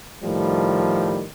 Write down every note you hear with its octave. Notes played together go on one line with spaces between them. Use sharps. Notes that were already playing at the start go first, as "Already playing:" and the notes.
A2 D#3 F3 G3